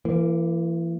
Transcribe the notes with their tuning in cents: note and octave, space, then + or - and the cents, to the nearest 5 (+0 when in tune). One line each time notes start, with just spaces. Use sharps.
E3 +30 A#3 -20